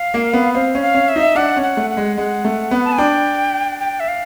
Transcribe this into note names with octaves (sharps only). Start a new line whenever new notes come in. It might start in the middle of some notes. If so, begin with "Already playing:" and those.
Already playing: F5
A#3
B3
C4 F5
C#4
F5
C#4
E5
D#4
D4 F#5
C#4
F#5
A3
F#5
G#3
G#3 F#5
A3
B3
A5
G#5
D4 G5
G5
E5
F5